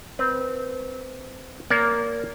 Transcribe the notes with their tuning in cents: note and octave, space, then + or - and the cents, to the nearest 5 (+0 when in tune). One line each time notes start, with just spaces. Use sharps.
C4 -20 B4 -25
A#3 +0 A#4 +0 D5 -40